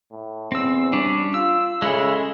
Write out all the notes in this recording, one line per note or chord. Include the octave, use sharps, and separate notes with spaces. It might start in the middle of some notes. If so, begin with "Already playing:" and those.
A2
E2 C4 E6
G3 C#4 D4
F4 E6
C#3 G#3 E4 A4